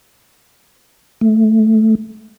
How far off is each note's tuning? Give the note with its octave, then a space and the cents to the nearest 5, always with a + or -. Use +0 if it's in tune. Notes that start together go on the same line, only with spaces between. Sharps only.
A3 -5